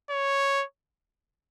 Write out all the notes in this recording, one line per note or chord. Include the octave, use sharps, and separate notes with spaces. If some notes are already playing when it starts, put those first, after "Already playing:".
C#5